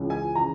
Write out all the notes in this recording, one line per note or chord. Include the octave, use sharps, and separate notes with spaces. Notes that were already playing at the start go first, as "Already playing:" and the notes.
Already playing: C#2 C#3 E3
G#5
C#3 E3 A#5